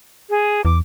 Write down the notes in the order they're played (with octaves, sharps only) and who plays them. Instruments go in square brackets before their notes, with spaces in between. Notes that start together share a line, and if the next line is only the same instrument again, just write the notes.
[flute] G#4
[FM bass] E2 [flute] D6